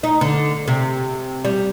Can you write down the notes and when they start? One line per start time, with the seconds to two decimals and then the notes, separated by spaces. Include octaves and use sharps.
0.03 D#4
0.21 D3
0.68 C3
1.45 G3